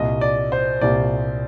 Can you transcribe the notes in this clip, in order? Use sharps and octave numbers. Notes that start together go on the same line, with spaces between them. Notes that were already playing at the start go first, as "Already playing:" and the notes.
Already playing: C2 A#2 G3 D#5
D5
C5
C2 A#2 G3 D5